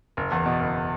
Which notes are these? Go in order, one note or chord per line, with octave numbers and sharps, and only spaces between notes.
F#1
E2
B2
F#1